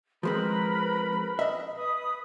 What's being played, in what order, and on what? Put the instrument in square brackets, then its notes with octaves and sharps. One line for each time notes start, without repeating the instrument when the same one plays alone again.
[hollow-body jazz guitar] F3 G#3 C4 [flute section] A#4 B4 B5
[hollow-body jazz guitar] D#5 E5
[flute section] B4 B5 D#6